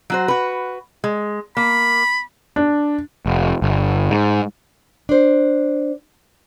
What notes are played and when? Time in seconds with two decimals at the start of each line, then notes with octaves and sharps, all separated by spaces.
0.10 F#3 F#4 C5
0.28 F#4 B4
1.04 G#3
1.57 A#3 B5
2.56 D4
3.26 F1
3.62 G1
4.11 G#2
5.09 D4 C5